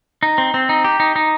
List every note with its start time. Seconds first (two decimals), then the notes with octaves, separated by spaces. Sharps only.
0.23 D#4
0.38 C4
0.54 C4
0.69 D#4
0.84 G4
1.00 D#4
1.16 D#4